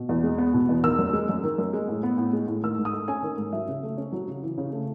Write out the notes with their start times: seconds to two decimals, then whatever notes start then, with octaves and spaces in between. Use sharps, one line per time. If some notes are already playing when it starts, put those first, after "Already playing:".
Already playing: B2
0.09 E2
0.24 G#3
0.38 B3
0.54 B2
0.69 E2
0.83 D#3 E6
0.99 F#2
1.13 G#3
1.29 F#2
1.43 D#3
1.58 F#2
1.73 G#3
1.88 A2
2.03 B3
2.18 A2
2.33 G#3
2.48 A2
2.63 D#3 E6
2.78 G#2
2.85 D#6
2.93 A3
3.08 C#4 G#5
3.23 D#3
3.38 G#2
3.53 F#3 E5
3.68 C#3
3.83 A3
3.98 C#4
4.13 F#3
4.28 C#3
4.42 E3
4.58 C#3
4.73 A3